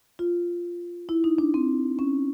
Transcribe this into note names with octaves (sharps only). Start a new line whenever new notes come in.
F4
E4
D#4
D4
C4
C#4